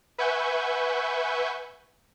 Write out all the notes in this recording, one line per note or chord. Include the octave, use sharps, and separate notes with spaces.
B4 E5 F#5 G#5 C#6 G6